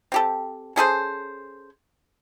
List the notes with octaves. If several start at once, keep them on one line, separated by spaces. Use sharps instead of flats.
C4 G4 A4
C#4 G#4 A4 C5